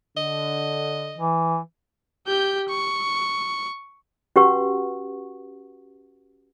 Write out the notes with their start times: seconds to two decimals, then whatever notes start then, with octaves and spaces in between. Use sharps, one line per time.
0.17 D3 D#5
1.18 E3
2.27 G4 G6
2.69 C#6
4.36 C#4 F#4 G4 B4 F#5 C#6